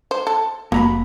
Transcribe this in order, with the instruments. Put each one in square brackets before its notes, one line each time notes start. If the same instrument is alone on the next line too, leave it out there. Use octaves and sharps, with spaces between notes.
[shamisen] C5
A4
[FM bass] F1 [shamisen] F#3 [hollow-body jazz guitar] A#3 A#5 B5